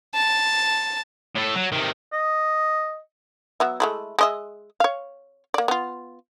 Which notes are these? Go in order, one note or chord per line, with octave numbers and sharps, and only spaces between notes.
A5
A2 A4
F#3
C3 D#3
D#5
F#3 B3 E5
G#3 A3 E4
G#3 D#5 E5
C#5 F5
A#3 D5
B3 F4